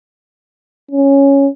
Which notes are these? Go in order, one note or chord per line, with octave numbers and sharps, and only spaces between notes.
C#4